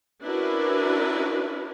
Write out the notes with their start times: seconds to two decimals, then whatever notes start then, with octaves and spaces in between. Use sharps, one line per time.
0.22 C#4 D4 E4 F#4 A#4 B4